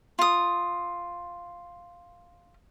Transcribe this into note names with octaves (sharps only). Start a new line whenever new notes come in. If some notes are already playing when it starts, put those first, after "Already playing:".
F4 D#6